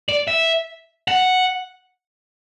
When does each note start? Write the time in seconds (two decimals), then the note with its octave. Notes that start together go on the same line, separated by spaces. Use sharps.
0.09 D5
0.28 E5
1.08 F#5